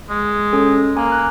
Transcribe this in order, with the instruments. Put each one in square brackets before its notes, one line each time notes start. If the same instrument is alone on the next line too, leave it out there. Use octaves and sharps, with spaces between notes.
[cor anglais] G#3
[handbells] C#4 A4
[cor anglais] A#3 [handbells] G#5
[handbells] F#6